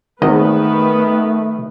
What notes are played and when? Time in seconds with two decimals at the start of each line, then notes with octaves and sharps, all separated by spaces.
0.22 G#1 E2 D#3 A3 B3 B4 D#5